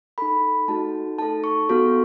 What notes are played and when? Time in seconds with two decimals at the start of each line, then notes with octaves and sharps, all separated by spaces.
0.18 D#4 A4 B5
0.68 A3 D#4 F#4 A4 A5
1.18 D#4 A4 A5
1.44 C#6
1.69 B3 F#4 A4